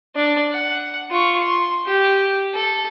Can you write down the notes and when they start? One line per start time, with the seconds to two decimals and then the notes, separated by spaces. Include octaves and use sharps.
0.15 D4 D5
0.51 F#5
1.11 F4 C#6
1.43 C6
1.86 G4
2.54 A4